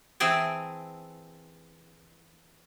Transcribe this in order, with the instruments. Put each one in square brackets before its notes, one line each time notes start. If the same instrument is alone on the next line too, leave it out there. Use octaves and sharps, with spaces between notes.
[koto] E3 C4 G#4 G5 A5